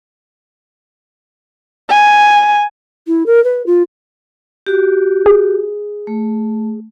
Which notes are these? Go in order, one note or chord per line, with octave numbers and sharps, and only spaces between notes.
G#5
E4
A#4
B4
F4
F#4 G4
G#4
A3